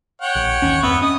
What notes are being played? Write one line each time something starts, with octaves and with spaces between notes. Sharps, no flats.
C#5 F#5 G5
A#1
G#1 D#2 C#4
E2 G2 B3 C4 E5
C#4 D#5 D#6